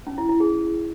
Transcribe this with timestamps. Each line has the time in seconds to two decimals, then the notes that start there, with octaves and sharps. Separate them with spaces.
0.07 C#4
0.18 E4
0.29 E4
0.40 G#4